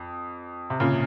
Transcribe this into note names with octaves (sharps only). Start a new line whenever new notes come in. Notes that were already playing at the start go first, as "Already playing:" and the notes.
Already playing: F2
C3
A#2 C#3